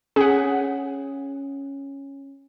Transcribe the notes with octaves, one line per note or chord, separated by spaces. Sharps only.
C#4 G#4 F#5